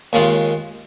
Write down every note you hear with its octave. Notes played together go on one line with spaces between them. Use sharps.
D#2 C#3 G#3 F4